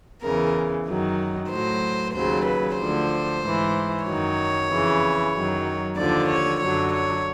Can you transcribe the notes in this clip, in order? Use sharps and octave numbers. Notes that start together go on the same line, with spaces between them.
E2 C#3 E3 A#4
F#2 D#3 F#3
A2 F#3 C5
D#2 C#3 F#3 C5
B4
D2 D3 F3 C5
G#2 E3
F#2 D#3 F#3 C#5
F2 C#3 E3
F#2 D#3 F#3
D#2 D3 F3 D5
C#5
F#2 D3 F#3 C#5
C#5